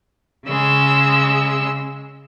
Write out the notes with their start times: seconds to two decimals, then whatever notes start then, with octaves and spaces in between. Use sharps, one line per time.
0.45 C#3 G#3 E6